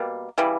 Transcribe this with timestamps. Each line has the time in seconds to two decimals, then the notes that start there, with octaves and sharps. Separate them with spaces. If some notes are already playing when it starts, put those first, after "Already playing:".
Already playing: B2 G3 A#3
0.38 C#3 E3 G3